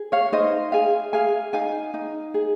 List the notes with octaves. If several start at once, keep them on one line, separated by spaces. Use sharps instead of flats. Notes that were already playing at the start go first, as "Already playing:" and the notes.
Already playing: G#4
C#5 F5
D#4 C5 D#5
G#4 F5 G#5
G#4 F5 G#5
D#4 F5 G#5
D#4
G#4